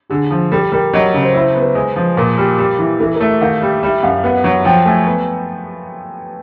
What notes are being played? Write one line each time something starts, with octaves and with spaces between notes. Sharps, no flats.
D3 G#4
F3
G3 A4
G3 A#4
F#3 D#5
C#3
C5
E4 C5
B3
B4
G#3
F3
A#2 A#4
G3
G3
E3
E3 A4
A#4
A3
E5
D#3 F5
G3
G3 E5
F#2 F5
B3 F#5
F#3
F3 G5
A3 G#5
B3